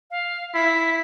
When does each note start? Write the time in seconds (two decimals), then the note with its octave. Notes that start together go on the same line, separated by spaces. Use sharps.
0.11 F5
0.54 E4 B6